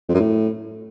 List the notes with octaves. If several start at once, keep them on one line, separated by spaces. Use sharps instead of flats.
F2
F#2
A2